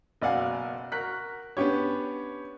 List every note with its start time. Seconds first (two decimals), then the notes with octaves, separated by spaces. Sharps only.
0.22 F#1 B2 D5 F5 F#5 G#5
0.92 F#4 A#4 F#6 B6
1.57 B3 C#4 D4 G4 C#5